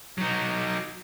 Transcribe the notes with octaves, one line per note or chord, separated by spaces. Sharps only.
F#3 D#4